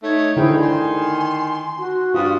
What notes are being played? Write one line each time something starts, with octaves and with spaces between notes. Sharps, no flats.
A3 D#4 C#5
D3 D#3 E4 G#4 C5 G5
G#5 C6
F#4
G2 F4 D#6